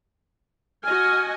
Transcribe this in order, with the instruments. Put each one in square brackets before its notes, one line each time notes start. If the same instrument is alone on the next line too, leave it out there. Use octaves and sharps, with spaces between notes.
[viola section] F#4 D#5 G#5 [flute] F6